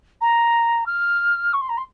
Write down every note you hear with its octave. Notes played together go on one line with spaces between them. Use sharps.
A#5
F6
C#6
C6
A#5
C6